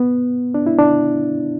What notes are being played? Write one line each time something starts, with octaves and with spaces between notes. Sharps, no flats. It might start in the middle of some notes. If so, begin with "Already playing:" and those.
Already playing: B3
D4
E4
D4